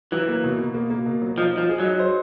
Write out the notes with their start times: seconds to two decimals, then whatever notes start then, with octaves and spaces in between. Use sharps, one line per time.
0.12 E3 F#3
0.28 A#3
0.44 B2
0.58 B2
0.74 A#3
0.90 A#3
1.06 B2
1.22 F#3
1.38 F3 D#4
1.53 F3 D#4
1.69 G#4
1.80 F#3 D#4
1.99 C5